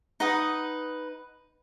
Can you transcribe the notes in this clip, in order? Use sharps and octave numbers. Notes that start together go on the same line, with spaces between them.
D#4 B4 F#5 D#6